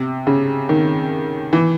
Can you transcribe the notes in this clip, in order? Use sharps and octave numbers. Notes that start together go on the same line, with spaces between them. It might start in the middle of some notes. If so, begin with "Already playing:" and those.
Already playing: C3
C#3
D#3
E3